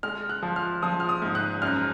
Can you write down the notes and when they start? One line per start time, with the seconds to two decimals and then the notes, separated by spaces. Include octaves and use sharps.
0.03 G#3 F6
0.29 F#6
0.43 F3
0.56 F6
0.82 F3 D#6
1.00 F6
1.09 D#6
1.22 G#2
1.35 F#6
1.62 F#2 F6